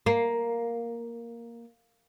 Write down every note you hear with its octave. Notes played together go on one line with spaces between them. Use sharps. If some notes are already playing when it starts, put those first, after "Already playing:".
A#3